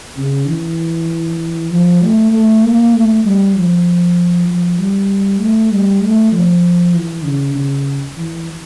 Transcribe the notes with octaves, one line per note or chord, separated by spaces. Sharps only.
C#3
E3
F3
A3
A3
A#3
A3
G3
F3
F3
G3
A3
G3
A3
F3
E3
C#3
C#3
E3